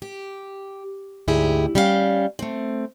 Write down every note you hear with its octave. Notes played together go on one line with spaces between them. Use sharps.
G4
D2 G#2 E4 G4 G#4
G3 C#4 E4 G4 F5 G5
A3 C4